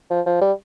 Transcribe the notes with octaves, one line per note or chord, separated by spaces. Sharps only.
F3
F3
G3